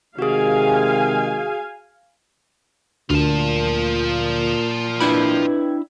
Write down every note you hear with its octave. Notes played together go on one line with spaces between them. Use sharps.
C3 D#3 G#3 F#4 G#4 F5 G#5
D2 A#2 F4 A5
D4 E4 B4 G5 B5 G#6